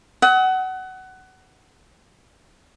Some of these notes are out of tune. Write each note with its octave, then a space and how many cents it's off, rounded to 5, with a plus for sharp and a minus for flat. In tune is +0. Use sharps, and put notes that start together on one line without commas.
F#5 +20 D#6 +45